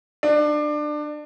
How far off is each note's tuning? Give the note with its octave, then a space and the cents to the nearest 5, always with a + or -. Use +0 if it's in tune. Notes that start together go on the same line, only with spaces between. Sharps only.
D4 +25